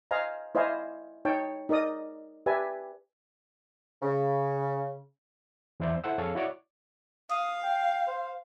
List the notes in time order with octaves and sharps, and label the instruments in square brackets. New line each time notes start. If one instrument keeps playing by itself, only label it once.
[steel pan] C5 D#5 F5 G#5 A#5
E4 C5 D5 D#5 F5 G#5
D#4 C#5 G5 A5
D#4 A#4 D5 D#5 D#6
G4 B4 D5 E5 G#5 A5
[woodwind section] C#3
[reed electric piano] E2 E3 E4 C5 D5 G6
E4 A4 C5 F#5 E6
F2 G#4 A4 C#5 F5
E4 F#4 C#5 D5 D6
[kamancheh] F5 [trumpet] D#6
[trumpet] G5
C5